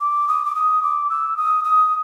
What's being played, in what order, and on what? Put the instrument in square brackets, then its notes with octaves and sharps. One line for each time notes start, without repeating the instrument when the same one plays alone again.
[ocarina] D6
D#6
D6
D#6
D6
E6
D#6
D#6